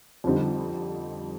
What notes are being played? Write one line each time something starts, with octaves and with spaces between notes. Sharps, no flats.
F2 D3 G3 C4 D#4